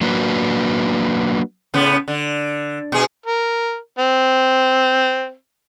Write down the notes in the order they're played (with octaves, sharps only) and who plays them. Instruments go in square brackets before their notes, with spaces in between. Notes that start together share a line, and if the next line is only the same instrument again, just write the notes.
[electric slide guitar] F#3 A#3 D4 F#4 B4
[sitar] A2 C#3 B3
D3
B2 G#4
[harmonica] A#4
C4